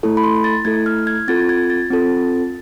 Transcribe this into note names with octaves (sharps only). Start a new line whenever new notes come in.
A3 E4 A4
B5
C6
A6
A3 E4 A4 G#6
F6
G#6
C4 F4 A4 A6
G#6
A6
C4 F4 A4